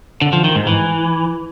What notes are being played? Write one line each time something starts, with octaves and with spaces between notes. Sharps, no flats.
D3
F3
D#3
G#2
E3